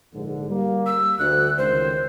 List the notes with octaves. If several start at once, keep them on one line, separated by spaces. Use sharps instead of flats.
A#1 G#2 D3
G3 A#3
E6
D2 F#6
C#2 D#3 C5